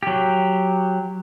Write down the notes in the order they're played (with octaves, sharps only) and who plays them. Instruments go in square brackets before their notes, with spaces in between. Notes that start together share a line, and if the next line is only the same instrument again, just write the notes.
[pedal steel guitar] F#3 G4